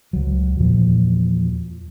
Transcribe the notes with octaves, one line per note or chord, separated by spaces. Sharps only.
C#2 F#3
E2 A#2 F3 F#3